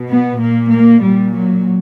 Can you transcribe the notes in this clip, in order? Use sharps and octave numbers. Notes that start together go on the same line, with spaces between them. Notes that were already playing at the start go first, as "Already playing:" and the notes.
Already playing: B2
B3
A#2 A#3
A#3
A#2 G3
F#3